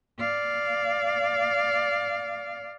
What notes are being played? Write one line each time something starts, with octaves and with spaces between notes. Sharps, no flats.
D5 F5